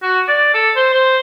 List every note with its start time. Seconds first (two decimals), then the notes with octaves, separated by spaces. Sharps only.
0.02 F#4
0.28 D5
0.54 A4
0.76 C5
0.93 C5